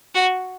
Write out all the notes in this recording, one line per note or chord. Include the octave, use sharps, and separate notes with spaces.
F#4